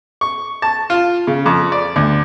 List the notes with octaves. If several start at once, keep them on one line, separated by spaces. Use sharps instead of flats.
C#6
A5
F4
C#3
F2
D5
D2